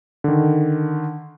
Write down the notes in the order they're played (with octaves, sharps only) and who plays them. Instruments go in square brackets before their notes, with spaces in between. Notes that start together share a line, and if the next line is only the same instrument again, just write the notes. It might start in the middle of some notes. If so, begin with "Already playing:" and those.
[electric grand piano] D3 D#3